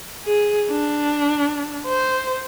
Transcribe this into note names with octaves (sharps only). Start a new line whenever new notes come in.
G#4
D4
C5